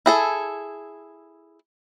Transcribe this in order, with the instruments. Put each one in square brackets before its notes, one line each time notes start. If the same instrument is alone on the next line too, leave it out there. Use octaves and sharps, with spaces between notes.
[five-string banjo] E4 G#4 A4